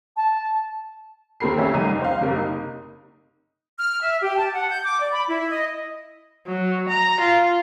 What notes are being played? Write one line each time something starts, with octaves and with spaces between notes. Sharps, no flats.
A5
D#2 C4 A4 A#4 B5 C7
A#1 C#4 G4 E5
F1 C2 D#4 A#5 D#7
C5 F5
F#1 C3 A#4
D#4
F6
E5
G4
A5
F#5
G6
D6
D5
B5
E4
D#5
F#3
A#5
F4